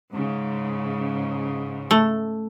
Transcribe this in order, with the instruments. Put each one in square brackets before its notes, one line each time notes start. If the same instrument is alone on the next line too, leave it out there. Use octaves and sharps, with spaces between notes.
[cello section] G#2 C#3
[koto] A3